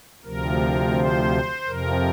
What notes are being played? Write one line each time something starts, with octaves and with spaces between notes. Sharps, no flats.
D2 C3 F3 A#4
C5
F2 C3 F3 A#4